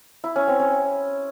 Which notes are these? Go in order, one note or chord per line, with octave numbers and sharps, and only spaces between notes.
E4
C#4
C4
C#4